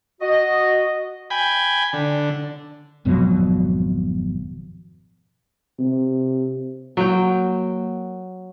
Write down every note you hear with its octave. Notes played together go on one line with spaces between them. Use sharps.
F#4 D#5
G5 G#5 B5
D3
G#1 F2 B2 F#3
C3
F#3 A#3 G5